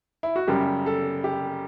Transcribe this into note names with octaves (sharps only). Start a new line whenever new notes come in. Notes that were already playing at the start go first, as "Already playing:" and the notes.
E4
F#4
F#2 C#3 G3 G4
A4
G4